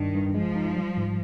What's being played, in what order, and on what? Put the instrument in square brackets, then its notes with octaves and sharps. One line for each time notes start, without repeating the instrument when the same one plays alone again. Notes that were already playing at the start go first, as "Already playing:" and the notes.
Already playing: [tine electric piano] G2 D4 [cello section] D#3
[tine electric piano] G2
[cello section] F3 [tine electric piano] G#3
[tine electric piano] D#4
G3
G#2